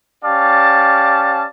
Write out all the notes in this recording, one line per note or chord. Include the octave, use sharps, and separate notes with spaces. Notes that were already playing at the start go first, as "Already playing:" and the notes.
C#4 G4 D5 F5 A5